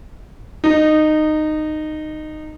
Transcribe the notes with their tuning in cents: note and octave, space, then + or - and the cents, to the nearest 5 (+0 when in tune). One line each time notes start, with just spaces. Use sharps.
D#4 -15